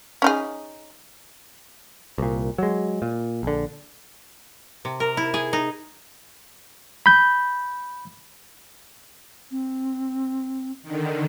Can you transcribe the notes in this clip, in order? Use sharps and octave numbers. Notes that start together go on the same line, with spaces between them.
C#4 D#4 G#4
C2 A#2
F#3 G#3
A#2
A#1 D3
C3
A#4
E4
G#4
D#4
B5 G6
C4
D3 D#3